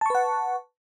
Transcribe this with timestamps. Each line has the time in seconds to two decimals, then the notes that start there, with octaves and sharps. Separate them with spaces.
0.01 A5
0.06 C#6
0.10 B4
0.15 F#5